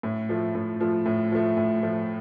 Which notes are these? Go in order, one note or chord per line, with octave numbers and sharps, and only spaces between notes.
A2
F3 A3
A2
F3 A3
A2
F3 A3
A2
F3 A3